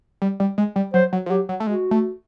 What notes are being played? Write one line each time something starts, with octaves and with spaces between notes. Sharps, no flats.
G3
G3
G#3
G3
F#3 C5
F#3
F3
F#3 G4
F#3
A3
G#3 F#4
A3